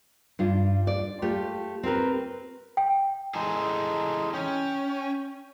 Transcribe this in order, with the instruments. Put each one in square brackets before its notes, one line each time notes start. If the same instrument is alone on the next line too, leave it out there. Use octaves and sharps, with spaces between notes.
[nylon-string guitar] G2 F4
D5
A3 F4 G4
C4 G4 A#4 B4
[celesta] G5
[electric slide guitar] E3 G#4 A4 [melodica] G#3 D#4
[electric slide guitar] C#4 [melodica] G5